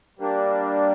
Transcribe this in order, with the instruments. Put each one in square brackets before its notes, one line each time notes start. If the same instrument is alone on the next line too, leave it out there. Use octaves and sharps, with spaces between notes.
[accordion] G3 A#3 D4